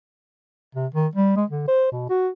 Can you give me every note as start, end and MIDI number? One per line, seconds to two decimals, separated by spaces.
0.75 0.87 48
0.94 1.07 51
1.15 1.36 55
1.36 1.45 56
1.50 1.65 50
1.68 1.88 72
1.92 2.08 47
2.10 2.29 66